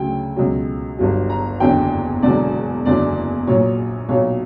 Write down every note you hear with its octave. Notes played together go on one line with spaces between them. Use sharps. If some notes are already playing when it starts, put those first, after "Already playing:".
Already playing: D2 C#3 F#3 G5
C#2 B2 F#3
G1 G2 F#3
A#5
F#1 E2 D3 F#3 G5
E1 E2 D3 F#3 D5
F#1 E2 D3 F#3 D5
A#1 A#2 F#3 C#5
B1 A#2 F#3 C#5